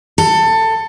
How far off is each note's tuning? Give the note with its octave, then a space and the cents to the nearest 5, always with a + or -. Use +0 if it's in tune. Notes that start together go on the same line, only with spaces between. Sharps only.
A4 +20